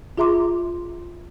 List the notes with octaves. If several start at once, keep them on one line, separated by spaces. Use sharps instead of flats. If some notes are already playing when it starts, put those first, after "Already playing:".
F4 G#4 E5 A#5 C6 D6